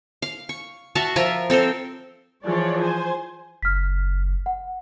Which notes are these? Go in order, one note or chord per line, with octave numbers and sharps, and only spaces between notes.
F5
C#6
F#4 E5 F5 A5
F3 F4 A#4 E5
C4 A4 A#4 C5
E3 F3 G#4 C#5 D5
C5 G#5
F#1 F6 B6
F#5